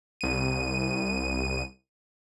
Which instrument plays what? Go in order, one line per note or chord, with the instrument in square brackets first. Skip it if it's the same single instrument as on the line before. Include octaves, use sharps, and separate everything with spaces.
[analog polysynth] C2 D#7